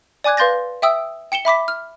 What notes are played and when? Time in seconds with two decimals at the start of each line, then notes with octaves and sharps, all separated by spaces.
0.24 D5 G#5 D6 F#6 G#6
0.37 B4 F5 C6 G6 A6 A#6
0.82 E5 G5 D#6 E6
1.32 G5 C#7 E7 G7
1.45 E5 B5 D6 B6
1.68 F6